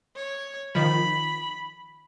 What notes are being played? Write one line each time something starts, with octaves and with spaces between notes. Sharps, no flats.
C#5
D#3 F3 B5